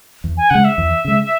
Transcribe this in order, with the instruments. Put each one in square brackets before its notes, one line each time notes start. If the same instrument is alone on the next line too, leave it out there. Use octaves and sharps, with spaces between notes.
[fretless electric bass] E2
[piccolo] G#5
[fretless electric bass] C#3 G#3 [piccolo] F#5
[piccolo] E5
[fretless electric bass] E2
C#3 G#3